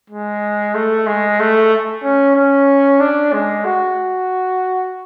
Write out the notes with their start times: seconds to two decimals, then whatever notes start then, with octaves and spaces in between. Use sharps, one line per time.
0.10 G#3
0.74 A3
1.06 G#3
1.40 A3
2.03 C#4
2.36 C#4
3.00 D4
3.33 G#3
3.65 F#4